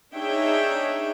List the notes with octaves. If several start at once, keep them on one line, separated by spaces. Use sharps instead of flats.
D4 D#4 G#4 C#5 E5 G5